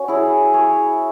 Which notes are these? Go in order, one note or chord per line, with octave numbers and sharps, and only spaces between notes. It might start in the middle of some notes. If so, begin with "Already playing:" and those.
Already playing: C#4 F#4
E4 G#4
G#4 C#5